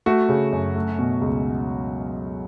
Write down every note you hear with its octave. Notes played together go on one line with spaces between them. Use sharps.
A3 F#4
C#3
F#2
A3
B2
C#2